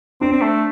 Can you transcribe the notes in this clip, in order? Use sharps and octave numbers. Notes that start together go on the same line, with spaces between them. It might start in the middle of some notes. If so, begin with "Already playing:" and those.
C4 D4
C4
A3